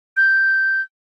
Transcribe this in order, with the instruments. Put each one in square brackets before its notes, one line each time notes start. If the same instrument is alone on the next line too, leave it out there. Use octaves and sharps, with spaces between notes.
[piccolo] G6